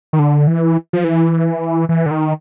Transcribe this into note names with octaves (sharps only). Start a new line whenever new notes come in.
D#3
D3
E3
F3
E3
E3
D3
D#3